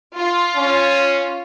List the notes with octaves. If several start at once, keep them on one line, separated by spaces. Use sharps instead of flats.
F4
C#4